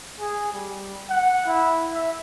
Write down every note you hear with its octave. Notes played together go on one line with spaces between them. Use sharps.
G#4
G3
F#5
E4
E5